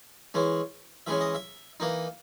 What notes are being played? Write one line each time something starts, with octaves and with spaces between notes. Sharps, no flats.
E3 G#3 C#4
E3 G#3 C#4 E5
D#5
E5
E3 A#3 D#4